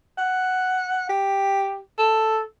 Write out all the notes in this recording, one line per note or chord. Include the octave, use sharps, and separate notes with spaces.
F#5
G4
A4